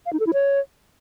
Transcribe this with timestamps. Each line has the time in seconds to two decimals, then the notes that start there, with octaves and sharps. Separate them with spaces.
0.06 F5
0.13 D#4
0.20 A4
0.27 E4
0.33 C#5